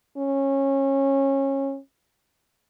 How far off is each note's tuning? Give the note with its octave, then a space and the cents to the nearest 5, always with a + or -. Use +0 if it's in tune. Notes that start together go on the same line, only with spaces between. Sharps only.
C#4 -20